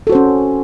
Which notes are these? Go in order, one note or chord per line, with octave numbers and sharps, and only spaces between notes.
C#4 F#4 A4 C5